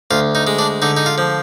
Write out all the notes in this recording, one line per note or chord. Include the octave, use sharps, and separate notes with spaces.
D2 F4
D#4
G#3
D4
D3 D#4
D#4
F4
F3